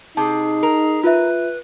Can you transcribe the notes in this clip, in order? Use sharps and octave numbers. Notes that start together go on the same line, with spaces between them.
C3 D#4 G#4 A5
A#4
F4 B4 E5